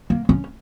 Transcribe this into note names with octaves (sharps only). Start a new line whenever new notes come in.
A#3
C#4